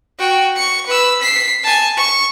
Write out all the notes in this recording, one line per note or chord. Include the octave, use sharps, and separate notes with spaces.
F#4 G5
C#6 C#7
B4 E6
B6 C7
G#5 A5
C#6